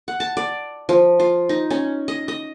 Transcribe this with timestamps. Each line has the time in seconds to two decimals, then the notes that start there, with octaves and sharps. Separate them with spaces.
0.08 F#5
0.20 A5
0.37 D5
0.89 F3
1.20 F4
1.49 D#4
1.70 C#4
2.08 D#5
2.28 D#5